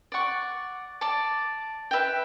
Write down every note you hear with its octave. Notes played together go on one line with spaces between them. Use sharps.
D5 F#5 C#6
D5 A5 D6
B4 E5 G5